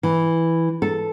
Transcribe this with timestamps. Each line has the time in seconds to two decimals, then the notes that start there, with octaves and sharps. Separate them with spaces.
0.03 E3
0.82 A4